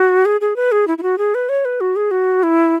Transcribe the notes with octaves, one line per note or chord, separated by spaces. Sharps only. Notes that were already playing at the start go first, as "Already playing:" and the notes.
Already playing: F#4
G#4
G#4
B4
G#4
E4
E4
F#4
G#4
B4
C#5
B4
F#4
G#4
F#4
E4